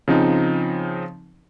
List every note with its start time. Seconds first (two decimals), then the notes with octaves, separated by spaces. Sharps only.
0.08 C#3 F3 C4 D#4